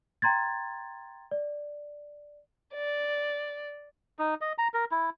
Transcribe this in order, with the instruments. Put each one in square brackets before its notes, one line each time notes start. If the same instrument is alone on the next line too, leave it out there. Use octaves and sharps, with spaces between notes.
[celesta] G5 A#5 C6 G#6 A6
D5
[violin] D5
[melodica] D#4
D#5
A#5
A#4
E4